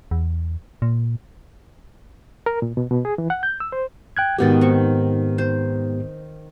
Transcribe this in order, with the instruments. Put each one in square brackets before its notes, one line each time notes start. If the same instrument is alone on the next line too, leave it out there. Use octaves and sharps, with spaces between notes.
[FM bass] E2
A#2
[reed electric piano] A#4
A#2
B2
B2
G#4
E3
F#5
G6
E6
C5
[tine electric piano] G5 F#6 G#6
[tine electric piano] G#2 B3 G4 [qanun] B2 D#3 D5
[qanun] C4 C#6
C5